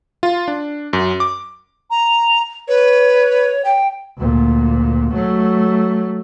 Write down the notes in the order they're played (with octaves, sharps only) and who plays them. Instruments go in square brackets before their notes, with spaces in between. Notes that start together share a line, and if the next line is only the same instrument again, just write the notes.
[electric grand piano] F4
D4
F#2
D6
[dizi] A#5
[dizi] B4 [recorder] C#5
[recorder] G5
[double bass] D2 A#2
F#3 A3